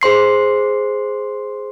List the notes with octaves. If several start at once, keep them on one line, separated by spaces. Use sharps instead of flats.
G#4 C5 C6 C7